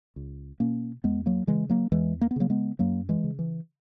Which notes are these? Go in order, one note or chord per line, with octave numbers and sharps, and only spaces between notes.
C#2
B2 A#3 C#4
E2 G#3 B3
F#3 A#3
C#3 E3 G#3
F#3 A#3
E2 E3 G#3
A#3
B3
C#3 F#3 A#3
G#3 B3
F#2 F#3 A#3
E3 G#3
C#3
E3